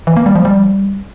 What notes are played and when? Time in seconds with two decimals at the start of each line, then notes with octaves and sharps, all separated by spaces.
0.07 E3
0.17 A#3
0.26 G3
0.36 F3
0.45 G3